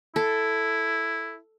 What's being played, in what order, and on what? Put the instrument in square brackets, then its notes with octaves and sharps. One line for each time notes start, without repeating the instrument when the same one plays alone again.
[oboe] E4 [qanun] A4